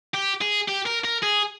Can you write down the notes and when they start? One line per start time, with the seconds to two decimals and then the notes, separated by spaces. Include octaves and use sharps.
0.14 G4
0.42 G#4
0.69 G4
0.86 A#4
1.05 A#4
1.23 G#4